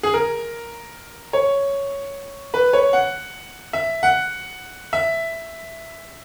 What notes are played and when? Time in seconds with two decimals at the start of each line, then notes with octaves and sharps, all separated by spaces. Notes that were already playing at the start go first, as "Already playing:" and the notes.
0.03 G#4
0.14 A#4
1.33 C#5
2.54 B4
2.73 C#5
2.93 F#5
3.73 E5
4.03 F#5
4.93 E5